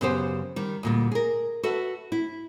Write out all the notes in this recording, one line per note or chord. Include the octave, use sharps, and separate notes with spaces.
F#2 C#3 B3 G4 C5
D#3 G3
D2 A#2 G3
G#4 A#4
F#4 A4 B4 E5
E4